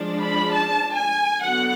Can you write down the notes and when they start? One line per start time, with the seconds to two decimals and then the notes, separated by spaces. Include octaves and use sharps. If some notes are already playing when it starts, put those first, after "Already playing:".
Already playing: F3 G#3 D4
0.22 B5
0.53 A5
0.97 G#5
1.42 D3 F#3 B3 F#5